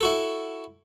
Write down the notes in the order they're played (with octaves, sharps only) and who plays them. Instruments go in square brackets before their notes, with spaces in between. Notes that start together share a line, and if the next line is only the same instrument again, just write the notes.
[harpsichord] E4 F#4 A4